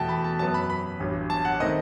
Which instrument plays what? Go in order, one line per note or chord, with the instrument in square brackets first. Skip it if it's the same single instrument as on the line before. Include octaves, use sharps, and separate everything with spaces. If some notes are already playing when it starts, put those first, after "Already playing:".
Already playing: [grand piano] E2 B2 A3 G5 A5
B5
A5
F#2 F#3 B3 A5
B5
B5
A1 G2 F#3
A5
F#5
D#3 A3 C4 D#5